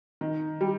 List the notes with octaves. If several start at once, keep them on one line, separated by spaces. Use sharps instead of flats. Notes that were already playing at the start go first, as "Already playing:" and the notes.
D#3
G3